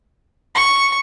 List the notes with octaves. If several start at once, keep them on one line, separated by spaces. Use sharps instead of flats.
C#6